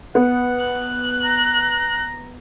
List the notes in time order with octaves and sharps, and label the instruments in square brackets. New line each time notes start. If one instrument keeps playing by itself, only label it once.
[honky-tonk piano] B3 [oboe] F#5
[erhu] F#6
[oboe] A#5